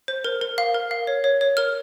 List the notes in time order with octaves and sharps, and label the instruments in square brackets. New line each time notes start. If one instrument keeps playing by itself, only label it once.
[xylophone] C5
A#4
A#4
F5
A#4
F5
C#5
C#5
C#5
A#4 F6